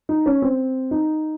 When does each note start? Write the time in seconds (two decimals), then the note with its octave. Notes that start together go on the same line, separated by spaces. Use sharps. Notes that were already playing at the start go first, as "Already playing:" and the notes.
0.09 D#4
0.26 C#4
0.42 C4
0.91 D#4